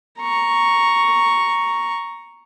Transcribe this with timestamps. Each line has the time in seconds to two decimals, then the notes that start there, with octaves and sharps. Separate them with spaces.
0.20 A#5 C#6